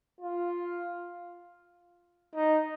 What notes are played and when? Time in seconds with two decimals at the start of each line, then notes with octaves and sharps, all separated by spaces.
0.21 F4
2.36 D#4